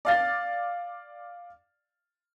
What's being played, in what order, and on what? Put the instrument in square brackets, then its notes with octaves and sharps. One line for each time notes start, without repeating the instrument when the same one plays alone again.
[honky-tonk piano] D5 F5 A6